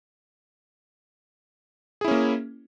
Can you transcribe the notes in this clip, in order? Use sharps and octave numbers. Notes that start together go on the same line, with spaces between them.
A#3 C#4 E4 G#4